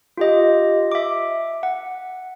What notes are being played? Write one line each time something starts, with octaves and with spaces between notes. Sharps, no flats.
F4 G4 D#5
E5 D6
F#5